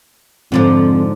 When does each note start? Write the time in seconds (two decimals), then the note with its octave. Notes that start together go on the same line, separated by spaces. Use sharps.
0.52 F2 G#2 D3 F3